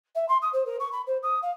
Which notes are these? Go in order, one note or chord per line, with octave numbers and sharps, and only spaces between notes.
E5
C6
D#6
C5
A#4
C#6
B5
C5
D#6
F5